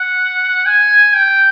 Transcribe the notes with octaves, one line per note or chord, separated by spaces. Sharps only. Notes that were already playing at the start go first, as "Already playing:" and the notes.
Already playing: F#5
G#5
G5